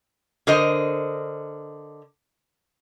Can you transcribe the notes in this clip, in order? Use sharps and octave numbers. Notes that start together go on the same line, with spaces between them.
D3 A#4 C5 D#5